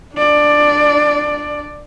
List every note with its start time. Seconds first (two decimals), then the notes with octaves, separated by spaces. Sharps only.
0.15 D4 D5